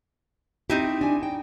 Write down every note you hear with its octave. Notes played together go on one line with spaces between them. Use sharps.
C4 D#4 E4 G4
D4 G#5
G5